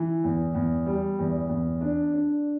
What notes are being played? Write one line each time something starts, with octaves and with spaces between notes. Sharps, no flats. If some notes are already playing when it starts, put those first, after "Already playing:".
Already playing: E3
E2
E2
G3
E2
E2
D4
D4